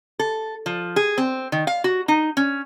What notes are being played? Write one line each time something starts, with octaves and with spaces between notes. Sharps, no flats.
A4
F3
G#4
C4
D#3
F5
F#4
D#4
C#4